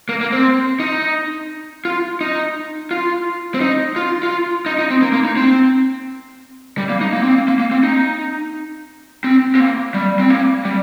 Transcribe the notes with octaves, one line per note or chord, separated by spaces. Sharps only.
A#3
A#3
C4
D#4
F4
D#4
F4
C4
D#4
F4
F4
D#4
D#4
C4
A#3
A#3
D#4
C4
G3
A#3
D#4
A#3
C4
A#3
A#3
A#3
C4
D#4
C4
C4
A#3
G3
C4
A#3
G3